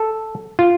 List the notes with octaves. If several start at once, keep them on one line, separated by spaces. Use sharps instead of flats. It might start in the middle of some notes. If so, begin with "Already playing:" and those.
Already playing: A4
F4